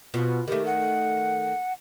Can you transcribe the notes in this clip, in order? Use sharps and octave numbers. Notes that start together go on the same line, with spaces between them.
B2 F4
D#3 A3 G4
F#5